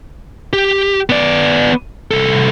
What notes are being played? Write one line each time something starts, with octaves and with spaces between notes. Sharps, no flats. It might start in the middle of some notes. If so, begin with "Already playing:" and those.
G4
B3 D5
C2 A4